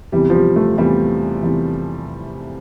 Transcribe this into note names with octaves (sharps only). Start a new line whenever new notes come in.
E2 C3 E3 G3
F3
G3
A3
E2 C3 E3 G3
E2 C3 E3